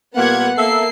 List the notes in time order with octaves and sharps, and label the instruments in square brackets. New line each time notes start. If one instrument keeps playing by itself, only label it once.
[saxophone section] A#2 G3 A#3 [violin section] B3 F#5 G#6
[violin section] A#3 C7 [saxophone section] A4 E5